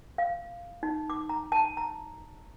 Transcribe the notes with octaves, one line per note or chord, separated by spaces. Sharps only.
F5
D#4
D6
A#5
A5
A#5